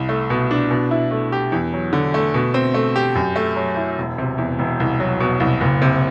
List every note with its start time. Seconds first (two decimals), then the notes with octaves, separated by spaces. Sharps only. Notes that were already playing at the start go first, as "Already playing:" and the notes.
Already playing: C2
0.09 A3
0.30 B2
0.51 D4
0.71 B2
0.91 E4
1.11 A3
1.32 G4
1.52 E2
1.73 F#3
1.93 D3
2.14 A3
2.34 B2
2.54 C4
2.74 A3
2.96 G4
3.15 F#2
3.36 A3
3.56 F#3
3.77 E4
3.98 E1
4.18 C3
4.38 E2
4.59 E1
4.80 C2
5.00 F#3
5.20 B2
5.40 C2
5.61 F#1
5.82 C3